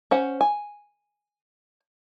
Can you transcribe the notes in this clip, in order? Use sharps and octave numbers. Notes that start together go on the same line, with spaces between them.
C#4 C5 F#5
G#5